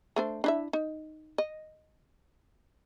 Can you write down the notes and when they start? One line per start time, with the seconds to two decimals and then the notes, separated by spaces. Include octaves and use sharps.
0.16 A3 D4 C5
0.44 D4 E4 E5
0.73 D#4
1.38 D#5